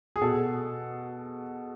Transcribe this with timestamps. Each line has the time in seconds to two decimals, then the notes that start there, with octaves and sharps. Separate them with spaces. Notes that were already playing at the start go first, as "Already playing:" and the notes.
0.16 G#4
0.22 B2 A4